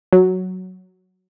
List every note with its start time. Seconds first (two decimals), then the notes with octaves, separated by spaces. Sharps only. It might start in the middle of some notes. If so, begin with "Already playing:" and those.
0.13 F#3